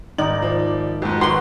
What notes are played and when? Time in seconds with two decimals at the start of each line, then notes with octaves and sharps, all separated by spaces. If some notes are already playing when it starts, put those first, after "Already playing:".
0.18 G#1 D#4 G4 D5 F#7
0.42 F3
1.02 F2 G#2 F#4 C5
1.21 D#3 F#4 B4 F#5 C6